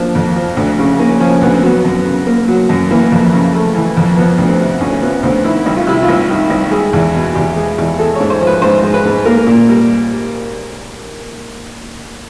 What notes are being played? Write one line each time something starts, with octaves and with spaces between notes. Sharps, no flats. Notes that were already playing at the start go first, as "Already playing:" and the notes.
Already playing: F3 A#3 D4
F2
F3
D2
C#3
A#3 C#4
F3 C#4
D2 B3
C4
F#3 B3
F#2
C#3
A#3
F#3
F#2
E3 A#3
F2
C#3
A3
E3
F2
F3 B3
D2
C4
C3
D2 C#4
F3 B3
D2 C4
D#3 E4
C2
F4
C3 E4
F4
C2
D#3
C2
G#3
E2
B2
E2 G4
G#3
E2
G#3 A4
C#5
G#2
C5
F3
B4
G#2 C5
G#3
B4
G#2
A#3 A#4
A#2
G3